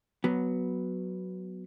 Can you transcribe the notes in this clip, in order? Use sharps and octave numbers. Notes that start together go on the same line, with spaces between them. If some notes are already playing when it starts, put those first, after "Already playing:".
F#3 B3